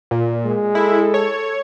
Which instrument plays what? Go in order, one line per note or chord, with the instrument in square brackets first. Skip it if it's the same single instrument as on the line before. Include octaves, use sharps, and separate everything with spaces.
[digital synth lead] A#2
[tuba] G#3
[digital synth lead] E4 [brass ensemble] A4
[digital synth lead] C#5